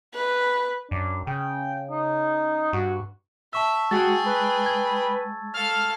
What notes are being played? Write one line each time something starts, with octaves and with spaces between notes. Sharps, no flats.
B4
F#2 D4
C#3 G5
D#4
G2 F#4
E5 A5 C#6 E6
G#3 F#4 G#4 G5 A6
B4
G#6
A4 F5 F6